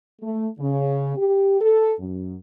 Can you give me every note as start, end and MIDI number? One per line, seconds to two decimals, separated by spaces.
0.21 0.45 57
0.58 1.15 49
1.16 1.55 67
1.60 1.93 69
1.99 2.35 42